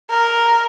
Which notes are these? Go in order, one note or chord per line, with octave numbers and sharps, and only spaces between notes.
A#4